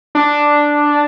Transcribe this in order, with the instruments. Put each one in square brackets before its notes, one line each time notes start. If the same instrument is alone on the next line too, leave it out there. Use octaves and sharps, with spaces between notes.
[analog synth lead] D4